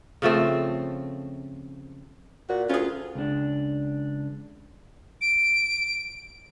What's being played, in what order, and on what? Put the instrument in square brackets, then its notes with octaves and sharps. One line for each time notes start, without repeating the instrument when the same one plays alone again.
[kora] C#3 F3 A3 C4
[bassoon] A#2 [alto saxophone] F#4
[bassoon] D2 [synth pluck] C#4 G#4 [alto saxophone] F4
[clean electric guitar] C#2 D4
[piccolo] D7